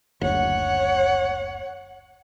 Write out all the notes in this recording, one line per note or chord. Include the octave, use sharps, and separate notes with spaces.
F#1 D2 C#5 F#5